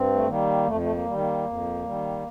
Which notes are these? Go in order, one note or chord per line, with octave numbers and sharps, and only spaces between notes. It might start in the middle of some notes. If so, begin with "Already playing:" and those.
Already playing: G2 C4
A3
D#3 G3 A#3
F2 A3
A3
A#3
D#3 G3
A#3
F2
D#3 G3